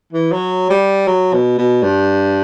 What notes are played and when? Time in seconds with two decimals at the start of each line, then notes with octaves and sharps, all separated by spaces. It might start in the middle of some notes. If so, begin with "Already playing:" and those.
0.13 E3
0.32 F#3
0.70 G3
1.07 F#3
1.33 B2
1.58 B2
1.83 G2